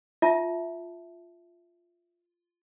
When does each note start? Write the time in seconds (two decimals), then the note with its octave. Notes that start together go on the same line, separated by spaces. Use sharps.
0.22 F4 E5 A5